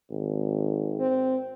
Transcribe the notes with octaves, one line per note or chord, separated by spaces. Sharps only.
G#1
C4